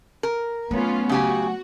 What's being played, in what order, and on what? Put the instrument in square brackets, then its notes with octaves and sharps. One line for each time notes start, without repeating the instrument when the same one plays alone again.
[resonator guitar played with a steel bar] A#4
[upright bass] F#3 A3 [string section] B3 C#4 F4
[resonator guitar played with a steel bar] C#3 G4 G#5 [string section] F#4